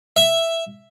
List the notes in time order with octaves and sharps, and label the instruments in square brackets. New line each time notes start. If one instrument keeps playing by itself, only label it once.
[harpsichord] E5